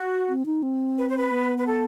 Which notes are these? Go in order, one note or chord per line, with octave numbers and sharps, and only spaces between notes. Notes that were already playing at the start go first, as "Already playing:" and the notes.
Already playing: F#4
C4
D#4
C4
B4
C5
B4
B3
B4
A4